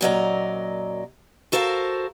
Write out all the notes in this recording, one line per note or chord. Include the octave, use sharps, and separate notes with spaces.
F#2 A#2 F#3 D5 D#5 A#5
F#4 A4 A#4 C5 D#5 F5